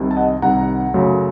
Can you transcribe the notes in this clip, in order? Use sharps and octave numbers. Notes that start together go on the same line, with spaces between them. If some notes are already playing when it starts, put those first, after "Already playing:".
Already playing: C2 C3 D#3
A5
D#5 F#5
C2 C3 D#3 F#5 A#5
F#2 C#3 F#3 A3